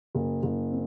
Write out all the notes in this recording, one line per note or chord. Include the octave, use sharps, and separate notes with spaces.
F#1
F#1
C4